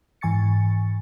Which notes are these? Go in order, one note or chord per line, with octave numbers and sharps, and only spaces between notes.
G#2 E3 G#5 C#6 A6 C#7